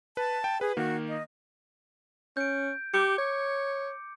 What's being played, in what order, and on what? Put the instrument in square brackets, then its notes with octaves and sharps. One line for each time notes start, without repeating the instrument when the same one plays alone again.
[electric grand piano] B4 [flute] A5
[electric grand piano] G5
[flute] G#4 [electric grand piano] B4
[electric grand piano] D#3 A#3 [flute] F#4
[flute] D#5
[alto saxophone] C#4 [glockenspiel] G6 D7
[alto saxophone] G4 [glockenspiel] D6 C#7
[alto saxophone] C#5